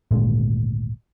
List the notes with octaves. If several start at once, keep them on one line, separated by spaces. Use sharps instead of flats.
G#1 D2 A#2 G#3